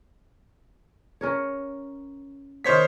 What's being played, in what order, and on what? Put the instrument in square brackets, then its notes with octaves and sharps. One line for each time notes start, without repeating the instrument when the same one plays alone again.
[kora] C#4 A#4 C#5
[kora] D#3 B3 [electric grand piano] C5 C#5 B6